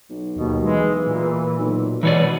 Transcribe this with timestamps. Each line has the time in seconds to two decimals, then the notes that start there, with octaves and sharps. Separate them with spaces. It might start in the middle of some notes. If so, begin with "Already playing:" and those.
0.10 B1
0.36 D#2 B2
0.64 E3 G#3
1.07 A#2
1.59 B1
2.03 G#2 B2 E3 C#5 D5